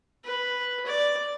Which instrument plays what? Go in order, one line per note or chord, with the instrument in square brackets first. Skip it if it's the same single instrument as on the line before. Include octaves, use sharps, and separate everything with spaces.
[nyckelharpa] B4
D5